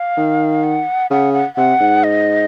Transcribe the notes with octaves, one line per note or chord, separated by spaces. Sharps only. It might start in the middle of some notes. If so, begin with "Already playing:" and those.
Already playing: F5
D#3
F#5
C#3 F#5
F#5
C3 F#5
G#2
D#5